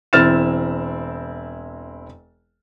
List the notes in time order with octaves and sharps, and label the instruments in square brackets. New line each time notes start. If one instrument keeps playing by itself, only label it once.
[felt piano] E1 C4 E4 F6 A6 E7